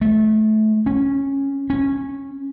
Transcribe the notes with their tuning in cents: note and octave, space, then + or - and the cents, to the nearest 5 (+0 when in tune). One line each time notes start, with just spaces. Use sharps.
A3 -25
C#4 -10
C#4 -15